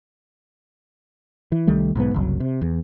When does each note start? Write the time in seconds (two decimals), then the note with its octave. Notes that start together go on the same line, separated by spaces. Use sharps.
1.52 E3
1.67 C2 D#3 G3 A3
1.95 B1 G#2 D#3 B3
2.14 F#1 C2 F#3
2.40 C3
2.62 E2